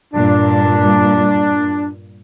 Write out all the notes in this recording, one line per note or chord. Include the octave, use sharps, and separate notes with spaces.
G2 A#2 D4